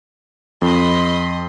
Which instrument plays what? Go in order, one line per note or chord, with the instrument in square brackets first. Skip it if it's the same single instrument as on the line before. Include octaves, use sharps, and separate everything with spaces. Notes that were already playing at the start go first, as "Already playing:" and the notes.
[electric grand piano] F2 [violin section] D#5 B5 C6